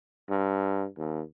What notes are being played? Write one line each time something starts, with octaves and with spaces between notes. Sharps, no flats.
G2
D#2